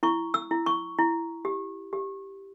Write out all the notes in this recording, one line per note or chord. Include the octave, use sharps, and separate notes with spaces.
E4 C#6
E6
E4
C#6
E4
G4
G4